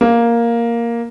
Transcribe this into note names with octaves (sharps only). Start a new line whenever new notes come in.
A#3